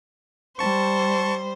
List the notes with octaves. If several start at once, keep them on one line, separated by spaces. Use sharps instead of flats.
G3 C5 A5 C#6